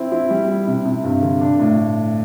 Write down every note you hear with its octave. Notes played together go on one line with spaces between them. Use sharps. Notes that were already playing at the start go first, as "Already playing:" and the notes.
Already playing: C4 E4
E4
G3
E4
C3
C3
G2
D3
D4
A2